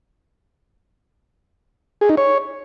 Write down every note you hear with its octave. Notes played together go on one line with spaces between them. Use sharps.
G#4
D#4
C#5